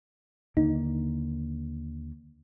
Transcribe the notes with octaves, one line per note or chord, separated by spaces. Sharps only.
D#2 D3 A#3 D#4